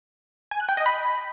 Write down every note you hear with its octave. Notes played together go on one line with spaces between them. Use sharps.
G#5
F#6
G5
D#5
B5